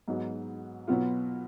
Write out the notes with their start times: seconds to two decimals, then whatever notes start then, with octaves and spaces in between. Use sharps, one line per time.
0.08 G#2 F#3 B3 D#4 F#4
0.88 B2 F#3 B3 F4